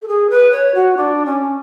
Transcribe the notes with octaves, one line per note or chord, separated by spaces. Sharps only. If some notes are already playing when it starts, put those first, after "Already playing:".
A4
G#4
B4
C#5
F#4
D4
C#4